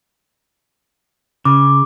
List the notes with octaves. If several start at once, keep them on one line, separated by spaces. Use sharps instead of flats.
C#3 D6